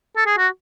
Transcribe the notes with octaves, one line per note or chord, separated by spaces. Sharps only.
A4
G#4
F#4